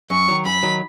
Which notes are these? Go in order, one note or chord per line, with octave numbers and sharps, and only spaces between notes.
F#2 C#6
D#3 F#3
F#2 B5
D#3 F#3